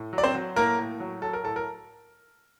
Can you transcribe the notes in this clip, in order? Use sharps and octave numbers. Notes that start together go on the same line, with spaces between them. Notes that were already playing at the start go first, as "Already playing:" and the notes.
Already playing: A2
F#3
D5
C4 C5
F#3
A2 A#3 A#4
A2
F#3
F#3 A4
A#4
A2 A4
A#4